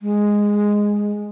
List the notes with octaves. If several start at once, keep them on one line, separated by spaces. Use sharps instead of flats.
G#3